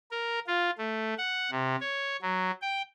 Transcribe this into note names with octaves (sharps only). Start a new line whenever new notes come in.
A#4
F4
A3
F#5
C3
C#5
F#3
G5